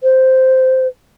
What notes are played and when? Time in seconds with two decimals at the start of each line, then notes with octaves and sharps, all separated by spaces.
0.03 C5